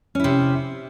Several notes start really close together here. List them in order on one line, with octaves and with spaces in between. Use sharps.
C#4 E4 C3